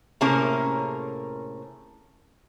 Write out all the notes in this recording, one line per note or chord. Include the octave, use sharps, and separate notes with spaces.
A2 C3 A#3 C#4 G#4 A#4